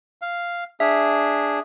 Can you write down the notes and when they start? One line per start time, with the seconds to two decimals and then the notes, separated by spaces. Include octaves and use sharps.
0.22 F5
0.80 D4 G#4 E5